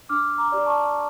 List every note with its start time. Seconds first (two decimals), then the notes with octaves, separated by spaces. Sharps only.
0.09 D4 D6 F6
0.38 A#5 D6
0.52 G4 D5
0.66 A5 C#6